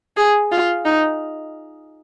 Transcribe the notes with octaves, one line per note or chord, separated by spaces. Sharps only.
G#4
F4
D#4